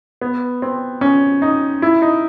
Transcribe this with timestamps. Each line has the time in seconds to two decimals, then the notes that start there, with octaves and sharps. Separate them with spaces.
0.21 B3
0.62 C4
1.01 C#4
1.42 D#4
1.82 E4
2.02 D#4